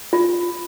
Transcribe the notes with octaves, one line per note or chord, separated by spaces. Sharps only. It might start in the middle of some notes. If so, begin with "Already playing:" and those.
F4